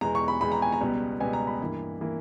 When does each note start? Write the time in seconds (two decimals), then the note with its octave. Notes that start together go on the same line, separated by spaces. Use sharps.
0.01 E2 B2 G#3 A#5
0.15 C#6
0.28 B5
0.41 E2 B2 G#3 B5
0.52 A#5
0.62 G#5
0.73 A#5
0.81 C#2 B2 G3 B3
1.20 C#2 B2 G3 B3 G#5
1.33 A#5
1.47 B5
1.61 G2 E3 A#3
2.01 E3 A#3